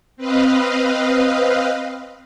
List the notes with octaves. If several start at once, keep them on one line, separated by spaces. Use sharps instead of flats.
C4 B4 D#5 F5